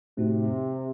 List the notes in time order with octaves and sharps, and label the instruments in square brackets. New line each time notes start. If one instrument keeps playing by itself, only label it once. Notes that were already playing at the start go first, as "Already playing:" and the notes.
[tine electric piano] A2 A3 C4 D#4 F#4 [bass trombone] C3